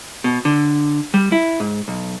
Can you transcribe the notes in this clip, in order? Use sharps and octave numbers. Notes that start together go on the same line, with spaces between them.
B2
D3
G3
E4
G#2
B1